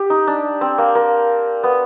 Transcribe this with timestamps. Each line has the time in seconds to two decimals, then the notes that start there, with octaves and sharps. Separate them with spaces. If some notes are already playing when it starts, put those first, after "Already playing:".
Already playing: G4
0.10 D#4
0.27 D4
0.61 C4
0.78 A#3
0.95 A#3
1.63 B3